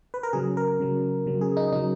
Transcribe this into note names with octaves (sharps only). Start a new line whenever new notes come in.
B4
A#4
C#3 F#3 G#4
A#4
C#3 F#3
C#3 F#3
G#4
D#4
C#3 F#3 D#4